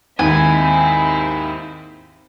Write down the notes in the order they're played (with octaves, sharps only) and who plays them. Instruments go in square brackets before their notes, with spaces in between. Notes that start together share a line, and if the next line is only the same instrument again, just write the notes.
[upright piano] D#2 G#2 [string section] C4 D#4 E4 [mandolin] G#5